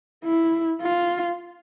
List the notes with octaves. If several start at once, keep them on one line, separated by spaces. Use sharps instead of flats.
E4
F4